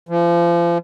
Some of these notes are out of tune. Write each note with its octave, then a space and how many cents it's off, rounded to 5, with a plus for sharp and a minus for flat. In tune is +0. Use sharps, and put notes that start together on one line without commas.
F3 -35